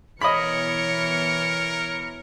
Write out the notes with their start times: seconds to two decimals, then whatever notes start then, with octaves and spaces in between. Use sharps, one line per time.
0.21 B2 E3 A#4 C#5 D#5 B5 C#7